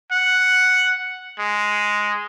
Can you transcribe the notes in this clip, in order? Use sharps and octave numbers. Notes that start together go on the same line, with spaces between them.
F#5
G#3